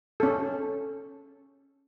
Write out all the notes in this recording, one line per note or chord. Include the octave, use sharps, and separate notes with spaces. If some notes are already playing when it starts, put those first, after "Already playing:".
C#4 A4